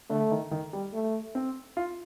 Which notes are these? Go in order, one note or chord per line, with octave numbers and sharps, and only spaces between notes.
D3 A3
D#3
D#3
G3
A3
C4
F4